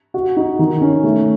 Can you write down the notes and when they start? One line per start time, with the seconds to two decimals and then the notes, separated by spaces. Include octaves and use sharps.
0.14 F#4
0.37 D#4
0.59 D#3
0.81 C#4
1.04 A3